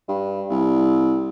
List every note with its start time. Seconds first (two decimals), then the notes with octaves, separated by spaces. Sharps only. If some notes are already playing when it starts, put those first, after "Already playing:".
0.09 G2
0.50 C2